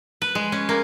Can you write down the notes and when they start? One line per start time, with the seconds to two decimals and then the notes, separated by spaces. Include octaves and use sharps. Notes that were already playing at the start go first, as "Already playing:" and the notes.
0.22 B4
0.35 G#3
0.52 C#4
0.69 A#3